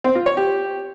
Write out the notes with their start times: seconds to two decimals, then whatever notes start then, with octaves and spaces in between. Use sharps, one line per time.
0.04 C4
0.15 F4
0.26 C#5
0.37 G4